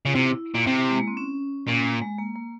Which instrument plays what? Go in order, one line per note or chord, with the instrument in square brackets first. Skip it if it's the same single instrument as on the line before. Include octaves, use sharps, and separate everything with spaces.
[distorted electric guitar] C#3 [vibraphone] F4
[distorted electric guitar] C3 [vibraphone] E4
[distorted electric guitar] A#2
C3
[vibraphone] G#3
A#3
C4
C#4
[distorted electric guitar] A#2 [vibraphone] C#4
[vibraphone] A#3
G#3
A#3
A#3